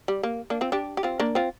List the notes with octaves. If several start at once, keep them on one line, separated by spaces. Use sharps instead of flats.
G3
A#3
A#3 D4
C4 F4
D4 G4
G4
C4 F4
A#3 D4
C4 F4